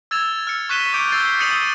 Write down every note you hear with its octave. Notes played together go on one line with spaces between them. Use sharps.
E6 G#6 A6 E7 F7
F6 C#7
C#6 F#6 B6 D#7 E7 G7
D6 G6 D7
E6 G6 A6 C7 G7
D#6 A6 C#7 D#7 F7 F#7